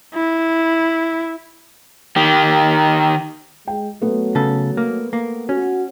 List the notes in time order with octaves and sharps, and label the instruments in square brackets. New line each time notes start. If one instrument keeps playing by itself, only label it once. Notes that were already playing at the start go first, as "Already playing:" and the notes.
[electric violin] E4
[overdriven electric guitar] D#3 G4
[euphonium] G#3 [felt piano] G5
[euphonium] F#3 [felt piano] A3 B3
[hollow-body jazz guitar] C#3 A4
A#3
A#3
[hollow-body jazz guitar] C#4 [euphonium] F#4